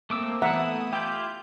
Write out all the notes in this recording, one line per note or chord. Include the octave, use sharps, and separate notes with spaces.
A3 A#3 C4 D6 E6
E3 A3 B3 E4 E5 F#5 A#5 D#6
E4 F4 G4 G5 G6